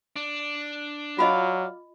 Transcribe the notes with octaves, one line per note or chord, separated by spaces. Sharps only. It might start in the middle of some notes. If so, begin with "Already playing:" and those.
D4
F#3 F4 D5 D#5 F5